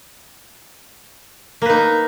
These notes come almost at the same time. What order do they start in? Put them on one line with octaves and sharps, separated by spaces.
A#3 B4 D#4